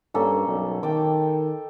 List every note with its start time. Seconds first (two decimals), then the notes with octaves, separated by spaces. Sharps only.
0.14 G2 A#3 C#4 A4
0.47 B1
0.83 D#3 G5 A5 D6